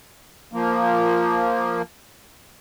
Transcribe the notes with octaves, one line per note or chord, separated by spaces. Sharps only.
F3 A#3